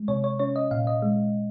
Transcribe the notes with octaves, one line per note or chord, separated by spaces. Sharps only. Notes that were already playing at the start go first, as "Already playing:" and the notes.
Already playing: G#3
C3 C#5
C#5
C#4 C#5
D#5
A#2 F5
D#5
G#3